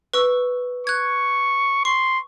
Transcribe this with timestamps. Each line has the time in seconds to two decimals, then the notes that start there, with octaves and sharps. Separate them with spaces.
0.14 B4 C#6 E6
0.87 C#6 F#6 G#6
1.85 C6 C#6